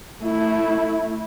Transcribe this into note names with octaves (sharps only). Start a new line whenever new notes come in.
A3 E4